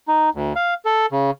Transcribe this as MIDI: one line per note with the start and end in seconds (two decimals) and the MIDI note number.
0.08 0.29 63
0.34 0.53 38
0.56 0.74 77
0.85 1.06 69
1.12 1.30 49